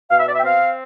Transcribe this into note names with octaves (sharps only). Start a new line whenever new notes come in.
B2 F5
E5
D5
E5
G5
C4 F5